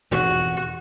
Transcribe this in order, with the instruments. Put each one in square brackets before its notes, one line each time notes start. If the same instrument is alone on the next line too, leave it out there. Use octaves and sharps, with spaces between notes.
[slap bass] E1 F2 G#2 [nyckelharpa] F#4